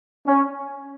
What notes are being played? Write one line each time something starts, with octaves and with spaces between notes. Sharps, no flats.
C#4